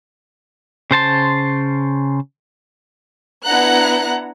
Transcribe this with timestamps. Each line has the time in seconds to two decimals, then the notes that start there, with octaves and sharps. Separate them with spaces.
0.91 C#3 C5 A5 C6
3.45 B3 D4 E4 F#5 A#5 F#6